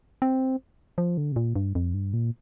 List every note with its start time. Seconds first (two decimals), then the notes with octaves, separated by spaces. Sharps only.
0.22 C4
0.98 F3
1.17 D3
1.32 C3
1.36 A#2
1.56 G2
1.75 F2
1.94 G2
2.13 A#2